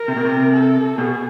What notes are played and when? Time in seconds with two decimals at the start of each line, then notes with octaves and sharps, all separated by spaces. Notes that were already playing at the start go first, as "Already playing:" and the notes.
Already playing: A#4
0.08 C3
0.16 B2
0.25 C3
0.53 A4
0.98 B2 G#4